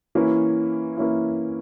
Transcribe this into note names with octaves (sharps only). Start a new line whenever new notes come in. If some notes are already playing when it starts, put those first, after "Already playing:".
E3 A#3 C#4 E4
E3 A#3 C#4 E4